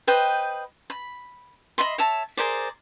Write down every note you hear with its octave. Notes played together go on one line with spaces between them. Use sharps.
B4 C5 D#5 G5
B5
D#5 E5 B5 C6
C#5 E5 A5
G#4 A#4 C5 D5